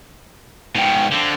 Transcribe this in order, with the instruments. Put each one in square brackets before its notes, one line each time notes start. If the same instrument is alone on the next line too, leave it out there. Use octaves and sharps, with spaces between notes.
[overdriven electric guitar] G#2 G5 [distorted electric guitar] B2 F3
[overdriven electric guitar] D3 [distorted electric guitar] F3 C4